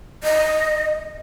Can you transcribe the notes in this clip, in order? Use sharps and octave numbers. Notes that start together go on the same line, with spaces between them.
D#5